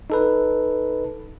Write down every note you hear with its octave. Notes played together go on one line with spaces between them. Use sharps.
D#4 A4 B4